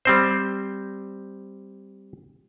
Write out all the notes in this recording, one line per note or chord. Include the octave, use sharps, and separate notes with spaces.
G3 C4 C5